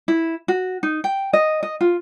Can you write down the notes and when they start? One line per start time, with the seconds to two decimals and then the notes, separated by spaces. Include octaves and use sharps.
0.08 E4
0.48 F#4
0.83 D#4
1.04 G5
1.33 D#5
1.63 D#5
1.81 F4